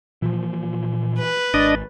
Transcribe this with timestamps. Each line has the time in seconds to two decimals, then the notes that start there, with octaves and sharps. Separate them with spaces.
0.22 A#2 E3 F3
1.19 B4
1.54 G#1 D4 D#5 A6